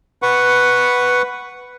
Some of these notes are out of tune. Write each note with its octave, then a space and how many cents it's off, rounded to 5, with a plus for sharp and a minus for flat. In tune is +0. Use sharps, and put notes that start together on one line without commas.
B4 +0 F#5 +0 C#6 +0